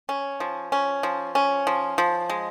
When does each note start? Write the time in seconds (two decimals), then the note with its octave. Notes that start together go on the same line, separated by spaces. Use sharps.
0.09 C#4
0.40 F3
0.72 C#4
1.03 F3
1.35 C#4
1.67 F3
1.98 F3
2.30 G#3